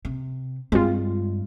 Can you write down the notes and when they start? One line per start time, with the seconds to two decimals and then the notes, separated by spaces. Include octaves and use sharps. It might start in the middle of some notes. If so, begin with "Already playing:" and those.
0.05 C3
0.72 G2 G#3 C4 F4